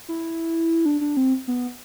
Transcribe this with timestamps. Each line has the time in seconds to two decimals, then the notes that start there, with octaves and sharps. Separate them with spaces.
0.09 E4
0.86 D4
1.01 D4
1.17 C4
1.48 B3